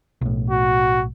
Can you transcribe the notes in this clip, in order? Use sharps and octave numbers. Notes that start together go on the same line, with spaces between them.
B1 A2
F#4